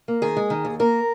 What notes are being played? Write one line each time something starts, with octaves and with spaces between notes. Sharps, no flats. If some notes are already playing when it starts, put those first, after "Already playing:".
A#3
D#3 G#4
G#3
D#3
D#2
A#3 A#4